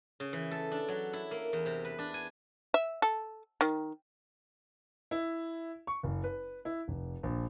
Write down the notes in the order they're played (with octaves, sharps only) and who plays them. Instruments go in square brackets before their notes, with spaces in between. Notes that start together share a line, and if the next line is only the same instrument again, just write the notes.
[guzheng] C#3
E3
A4
D4
F#3
E4
A#3
E2
C3
B4
D4
G#5
[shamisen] E5
A4
D#3
[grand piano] E4
C#6
F#1
B4
E4
F1
A#1